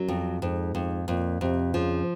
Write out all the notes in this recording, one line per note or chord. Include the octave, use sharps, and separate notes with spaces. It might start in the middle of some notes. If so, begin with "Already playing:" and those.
Already playing: F#2 F#3
F2
F2 G#2
F2
F2 A#2
F2 C3
C#3 F3